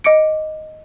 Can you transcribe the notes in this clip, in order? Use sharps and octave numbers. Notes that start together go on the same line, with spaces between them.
D#5 D6 C#7 D7